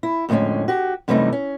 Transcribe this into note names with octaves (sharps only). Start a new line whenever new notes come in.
E4
F2 A2 D3 G#3 C#4
F#4 G4
F#2 C3 E3 G3 A3 D#4
C#4